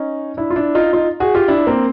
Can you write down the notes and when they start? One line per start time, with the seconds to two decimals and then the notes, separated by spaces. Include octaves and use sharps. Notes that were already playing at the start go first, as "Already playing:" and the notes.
Already playing: C#4 D#4
0.37 D4 E4
0.50 F4
0.56 D4 E4
0.75 D#4 F4
0.93 D#4 F4
1.20 F#4 G#4
1.35 F4 G4
1.48 D4 E4
1.67 A#3 C4